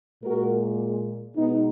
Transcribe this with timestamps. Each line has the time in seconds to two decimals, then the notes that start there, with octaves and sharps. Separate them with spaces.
0.23 A#2 G#3 F#4 A#4
1.35 B2 G#3 B3 D#4